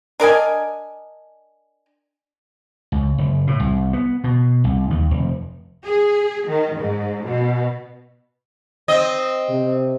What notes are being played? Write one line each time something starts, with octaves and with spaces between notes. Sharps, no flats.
D4 A#4 D#5 G#5
C#2
F#1
A2
C2
B3
B2
C2
D#2
F1
G#4
D#3
G#2
B2
C4 D#5
C3